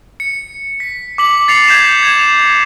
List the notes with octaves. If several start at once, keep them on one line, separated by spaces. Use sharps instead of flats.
C#7
B6
D6 B6 F#7
A6 C7 C#7 F7
G6 G#6 B6 E7 F7
G#6 E7 F7